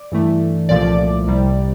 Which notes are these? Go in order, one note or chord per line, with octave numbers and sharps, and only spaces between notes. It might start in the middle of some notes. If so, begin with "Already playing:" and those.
Already playing: D5
G2 E3 A3
C2 A#2 F3 A3 D5
C2 C3 G3